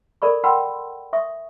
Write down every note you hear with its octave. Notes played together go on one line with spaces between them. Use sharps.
A4 A#4 D5 B5 C#6
F#5 G5 A5 B5 C6 E6
E5 C#6 D#6